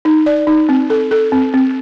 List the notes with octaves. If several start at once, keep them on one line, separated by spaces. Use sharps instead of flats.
D#4
D5
D#4
C4
A4
A4
C4
C4